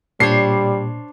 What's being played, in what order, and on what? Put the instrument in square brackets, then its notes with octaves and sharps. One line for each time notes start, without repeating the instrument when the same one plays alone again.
[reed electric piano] A#2 [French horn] G3 [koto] D4 C5 C#5 [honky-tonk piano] C7